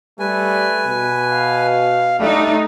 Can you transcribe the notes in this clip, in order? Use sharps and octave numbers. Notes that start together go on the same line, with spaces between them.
G3 A3 B4 G#5
B2
F5
G3 A3 D4 D#4